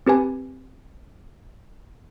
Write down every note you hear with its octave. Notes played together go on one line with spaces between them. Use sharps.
C4 G4 B4 G#5